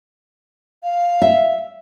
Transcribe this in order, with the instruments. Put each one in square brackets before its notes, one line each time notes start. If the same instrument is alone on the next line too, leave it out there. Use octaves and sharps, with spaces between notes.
[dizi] F5
[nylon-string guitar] E5